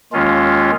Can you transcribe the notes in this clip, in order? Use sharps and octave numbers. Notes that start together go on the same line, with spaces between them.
D#2 D#3 G#3 C#4 F4